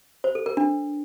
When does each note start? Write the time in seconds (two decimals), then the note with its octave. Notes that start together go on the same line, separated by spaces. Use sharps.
0.24 C5
0.35 A4
0.46 A#4
0.57 D4